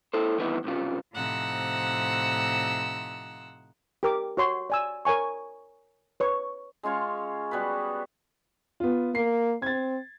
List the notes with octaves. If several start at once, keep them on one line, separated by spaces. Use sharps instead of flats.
E4 A4 C5
G2 D#3 E3 B3 D#4 E4
C2 G2 C#3 F4
A2 C3 F3 D#4 F#5 E6
G4 A#4 D6
F#4 C#5 C6
D5 G#5 E6
A#4 C#5 G#5 C#6
B4 C#5 C#6
G#3 C#4 F4 C#5
G3 B3 F#4 B4
B3 F4
A#3 C7
C4 G#6 A6